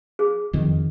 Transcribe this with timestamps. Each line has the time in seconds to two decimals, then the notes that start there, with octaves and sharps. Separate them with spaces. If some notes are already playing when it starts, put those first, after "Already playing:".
0.19 G#4
0.53 F2 D#3